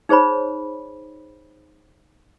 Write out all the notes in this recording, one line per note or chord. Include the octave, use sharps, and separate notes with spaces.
D#4 G#4 C5 C#5 B5